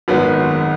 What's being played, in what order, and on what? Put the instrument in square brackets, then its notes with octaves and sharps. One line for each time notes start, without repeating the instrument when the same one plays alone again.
[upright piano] G#1 F#2 D#3 G#3 B3